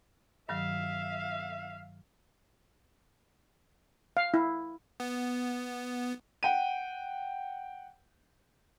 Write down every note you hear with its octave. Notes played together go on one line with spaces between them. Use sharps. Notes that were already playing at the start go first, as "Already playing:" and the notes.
G2 D#3 F#3 E5 F5
F5
E4
B3
F#5 G5 D#7